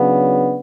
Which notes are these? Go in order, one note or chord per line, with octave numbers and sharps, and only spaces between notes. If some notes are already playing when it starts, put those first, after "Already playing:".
Already playing: C#3 F#3 B3 D4